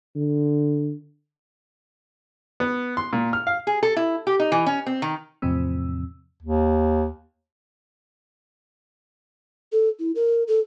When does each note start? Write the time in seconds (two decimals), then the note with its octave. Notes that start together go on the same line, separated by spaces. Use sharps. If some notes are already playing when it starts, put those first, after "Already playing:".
0.16 D3
2.60 B3
2.97 C6
3.13 A#2
3.33 F6
3.47 F5
3.67 G#4
3.83 A4
3.96 E4
4.27 G4
4.39 D#4
4.52 E3
4.66 C#4
4.86 C4
5.02 D#3
5.42 E2 A2 C3 F3 C4 E6
6.43 D#2
9.72 A4
9.99 E4
10.15 A#4
10.48 A4